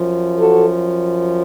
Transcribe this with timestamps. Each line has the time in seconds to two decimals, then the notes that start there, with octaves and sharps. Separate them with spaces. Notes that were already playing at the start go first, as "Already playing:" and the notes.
Already playing: F#2 F3
0.38 F#4 A4